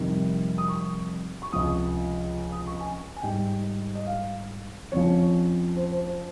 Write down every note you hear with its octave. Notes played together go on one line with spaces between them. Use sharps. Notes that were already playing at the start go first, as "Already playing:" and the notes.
Already playing: F2 C3 D#3 G3
D#6
C#6
C#6
C#2 C3 F3 D#6
D#6
C#6
G#5
G#5
G#2 G3 G5
D#5
F5
F2 C#3 F3 C#5
C5
C5
C5